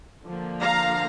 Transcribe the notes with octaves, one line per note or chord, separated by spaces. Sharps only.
D3 F3 A#3
F5 A#5